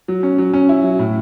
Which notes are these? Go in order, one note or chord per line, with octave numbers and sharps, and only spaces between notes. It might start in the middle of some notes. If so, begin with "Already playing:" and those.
F#3
C#4
F#3
C#4
E4
F#3
A2